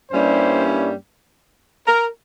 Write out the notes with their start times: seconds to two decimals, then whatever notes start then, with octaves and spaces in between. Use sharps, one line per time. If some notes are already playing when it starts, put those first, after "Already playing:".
0.10 G2 G3 A#3 C#4 E4 C5
1.86 A#4